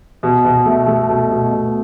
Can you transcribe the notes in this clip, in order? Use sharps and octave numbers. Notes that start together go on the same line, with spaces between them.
B2
B2
A3
A3
B2
B2
B2